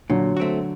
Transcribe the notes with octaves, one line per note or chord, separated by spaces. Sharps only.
A#2 D3 F#3
A3 C4 F#4